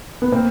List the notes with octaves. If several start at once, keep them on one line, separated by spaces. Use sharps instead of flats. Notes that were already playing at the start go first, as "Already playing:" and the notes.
B3
A#3 C4